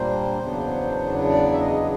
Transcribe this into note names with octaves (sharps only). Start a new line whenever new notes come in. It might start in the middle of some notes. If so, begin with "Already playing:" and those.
Already playing: A#2 G3 A#3 D4 C5
E2 C#3 F#3 B3 D4
D5
E5
D#5